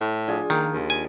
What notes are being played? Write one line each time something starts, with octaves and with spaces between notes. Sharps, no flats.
A2
F3 D4 G#4
D#3 A#3
D#2
G#5